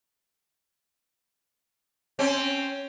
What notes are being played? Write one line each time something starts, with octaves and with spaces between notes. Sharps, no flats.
C4 C#4